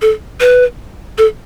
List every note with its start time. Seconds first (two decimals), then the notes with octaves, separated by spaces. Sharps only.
0.02 A4
0.41 B4
1.18 A4